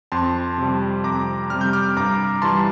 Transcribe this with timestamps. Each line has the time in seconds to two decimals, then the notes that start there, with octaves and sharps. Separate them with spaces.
0.12 F2 A5 C6
0.58 C3 G3
1.04 F2 A#5 D6
1.50 C3 G3 F6
1.61 G6
1.73 D6 F6
1.96 G2 A#5 D6
2.42 E3 G3 A5 C6